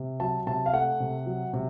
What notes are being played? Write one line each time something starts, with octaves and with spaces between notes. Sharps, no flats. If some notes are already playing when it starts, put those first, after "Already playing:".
Already playing: C3
F#3 A5
C3 A5
F5
A3 F#5
C3
F#3
C3